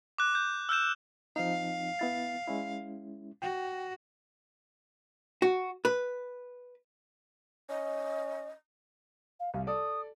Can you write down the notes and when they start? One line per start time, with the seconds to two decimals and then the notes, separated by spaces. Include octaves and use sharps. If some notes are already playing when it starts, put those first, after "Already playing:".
0.18 D6 F#6
0.35 G6
0.69 E6 F6 G6 E7
1.36 F3 C4 D#4 F5
1.99 B3 E4 A6
2.47 G#3 C#4 E4
3.42 F#4 G5
5.42 F#4
5.85 B4
7.69 C#4 D#5
9.40 F5
9.54 C2 F5
9.67 A4 D5 D#6